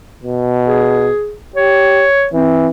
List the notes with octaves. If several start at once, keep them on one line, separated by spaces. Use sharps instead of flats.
B2
G#4
G4 C#5
E3 C4